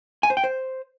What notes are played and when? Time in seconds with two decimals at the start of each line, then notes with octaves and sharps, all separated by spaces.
0.23 G#5
0.30 C5
0.37 G5
0.44 C5